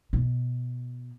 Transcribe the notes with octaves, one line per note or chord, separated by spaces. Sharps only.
B2